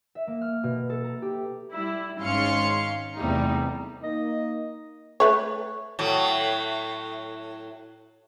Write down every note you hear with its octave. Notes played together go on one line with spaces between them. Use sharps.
E5
A#3
F6
B2
A4
A#5
G4
G3 E4
G#1 G#2 C#4 F5 C6 C#7
E2 C3 G3 A3 D#4
A#3 D#4 D#5
A3 B4 C#5
A2 F#3